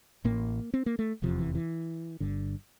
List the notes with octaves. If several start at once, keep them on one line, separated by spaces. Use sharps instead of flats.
A1 A2 A#3
C4
A#3
A3
F1 E2 C3 F3
E3
E3
G1 G2 D3